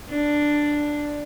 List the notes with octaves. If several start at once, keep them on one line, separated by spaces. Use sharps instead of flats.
D4